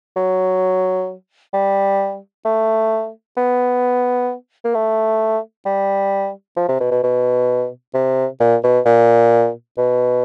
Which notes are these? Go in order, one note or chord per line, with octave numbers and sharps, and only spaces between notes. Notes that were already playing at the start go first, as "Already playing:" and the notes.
F#3
G3
A3
B3
A#3
A3
G3
F3
C3
B2
B2
B2
C3
A#2
B2
A#2
B2